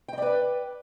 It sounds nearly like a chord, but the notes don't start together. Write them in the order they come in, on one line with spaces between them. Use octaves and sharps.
G5 D#5 D5 B4